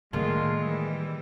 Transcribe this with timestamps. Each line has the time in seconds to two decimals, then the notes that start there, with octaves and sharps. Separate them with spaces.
0.13 A2 D3 D#3 G#3 A#3 F4
0.62 E3 G3 E4